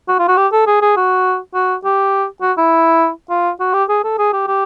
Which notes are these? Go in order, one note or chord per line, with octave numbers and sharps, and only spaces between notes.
F#4
F4
F#4
G4
A4
G#4
G#4
F#4
F#4
G4
F#4
E4
F4
F#4
G4
G#4
A4
G#4
G4
G4